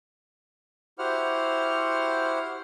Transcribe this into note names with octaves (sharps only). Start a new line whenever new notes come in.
E4 F#4 G4 C5 F#5 F6